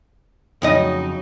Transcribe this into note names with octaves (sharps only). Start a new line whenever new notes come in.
F2 C#3 F#3 D#4 D#5